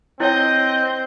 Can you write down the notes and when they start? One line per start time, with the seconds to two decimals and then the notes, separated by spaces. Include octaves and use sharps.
0.20 C4 E4 C#5 D#5 G5 G6